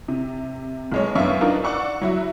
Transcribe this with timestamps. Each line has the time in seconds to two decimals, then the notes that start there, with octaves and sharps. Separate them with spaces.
0.08 C3
0.92 B1 G#3 C#5
1.15 F#2 B3 D4 E5 F5 C#6
1.41 D4 D#4 F4 A#4
1.64 D5 F#5 C#6 E6
2.01 F#3 E4 F#4